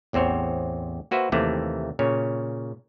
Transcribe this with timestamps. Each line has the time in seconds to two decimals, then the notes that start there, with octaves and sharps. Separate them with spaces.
0.13 A1 E2 C4 C5 C#5
1.11 A#3 F#4 B4 C5 E5
1.32 D#2 C3 E3 A3 A#3
1.99 A#2 C#3 C#5